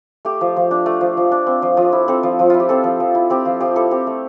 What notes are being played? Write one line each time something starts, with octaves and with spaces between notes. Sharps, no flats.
A3 G4
F3
F3
D4
A3
F3
F3
D4
C4
F3
F3
E4
C4 A4
F3
F3
E4 F4
G4
C4 A4
F3
F3
E4
C4 G4
F3 F4
F3 G4
E4 A4
C4 G4
A3